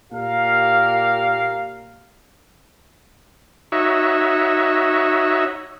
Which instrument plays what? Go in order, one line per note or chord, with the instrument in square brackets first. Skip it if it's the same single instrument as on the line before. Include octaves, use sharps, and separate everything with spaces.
[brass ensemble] A#2 A#3 G4 A#4 F5
[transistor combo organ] D#4 F#4 C#5 E5